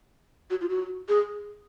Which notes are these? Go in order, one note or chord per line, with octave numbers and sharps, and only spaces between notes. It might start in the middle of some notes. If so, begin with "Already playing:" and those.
F#4
F4
F#4
G#4